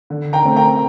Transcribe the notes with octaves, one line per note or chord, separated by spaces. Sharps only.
D3
G5 A#5
A3 C4
G5 A#5